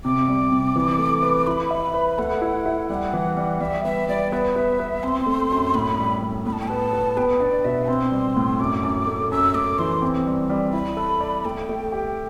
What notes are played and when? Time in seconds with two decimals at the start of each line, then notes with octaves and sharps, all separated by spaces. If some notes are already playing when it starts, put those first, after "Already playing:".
0.04 C3 D6
0.28 G3
0.52 C3
0.76 E3
0.99 A3
1.23 B4
1.47 E4 B5
1.71 E5
1.94 B4
2.18 A3 F#5
2.41 E4
2.66 E4
2.89 G3 F#5
3.13 E3
3.37 G3
3.61 G3 E5
3.85 B3 E5
4.08 G3 D5
4.32 B3 E5
4.56 B3
4.79 B3
5.03 C4 C6
5.26 A3
5.51 F#2
5.74 A2 B5
5.99 G3
6.22 A2
6.46 A2 B5
6.53 A5
6.60 G5
6.68 B3 A5
6.93 B3
7.17 B3 G5
7.40 D4 D5
7.65 B2 E5
7.88 C4 C6
8.12 G3
8.37 A2
8.60 F#2 D6
8.83 F#2
9.07 A3
9.31 F#2 E6
9.54 A3 D6
9.79 E3 C6
10.02 C4
10.26 G3
10.50 G3
10.73 E4 B5
10.97 A4
11.21 D5
11.45 A3 G5
11.69 A3
11.92 G4